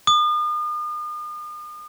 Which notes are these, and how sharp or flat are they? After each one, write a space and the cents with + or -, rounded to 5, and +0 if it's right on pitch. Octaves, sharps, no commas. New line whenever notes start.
D#6 -40